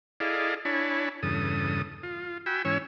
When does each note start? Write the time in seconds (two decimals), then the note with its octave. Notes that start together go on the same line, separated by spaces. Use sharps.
0.20 E4 G#4 A4 D5 D#5 F5
0.65 D4 E4 C#5 G#5 A5 B5
1.23 E2 G2 C#3 A4 D#6
2.03 F4
2.46 F#4 G5 G#5 B5 E6
2.65 G#2 E3 C#4 C#5 G#5 E6